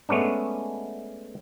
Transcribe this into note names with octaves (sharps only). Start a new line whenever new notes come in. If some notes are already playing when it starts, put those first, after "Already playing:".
G#3 A3 B3 C#4 D4